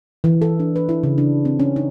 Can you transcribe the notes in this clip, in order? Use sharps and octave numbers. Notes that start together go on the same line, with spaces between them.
E3
A4
D4
B4
E4
C#3
D4
C4
C#4
D#4